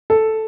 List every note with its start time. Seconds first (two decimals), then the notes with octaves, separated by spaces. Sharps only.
0.10 A4